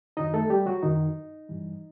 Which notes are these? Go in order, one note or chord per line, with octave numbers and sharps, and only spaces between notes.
F#2 D#3 F#3 D#4 D#5
A3 A4
G3 G4
F#3 F#4
F#2 D#3 F#3 D#4
G2 E3 G3